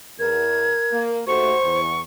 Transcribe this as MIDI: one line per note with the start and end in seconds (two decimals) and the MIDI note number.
0.19 0.70 40
0.19 1.11 70
0.19 1.01 92
0.92 1.21 58
1.27 1.54 39
1.27 1.54 57
1.27 1.54 66
1.27 1.80 72
1.27 2.01 85
1.63 2.03 40